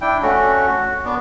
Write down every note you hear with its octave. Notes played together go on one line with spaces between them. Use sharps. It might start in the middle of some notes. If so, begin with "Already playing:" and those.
D4 E4 G5
A3 C#4 F#4
F#4
B3 D4